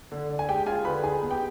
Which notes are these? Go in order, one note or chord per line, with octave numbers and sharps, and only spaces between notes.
D3
D4
G#5
G#3 G4 G5
F4 G#4 G#5
D3 B4 B5
D#4 G#4 G#5
B3
G4 G5